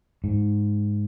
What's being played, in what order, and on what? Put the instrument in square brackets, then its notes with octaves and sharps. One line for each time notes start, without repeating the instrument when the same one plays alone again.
[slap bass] G#2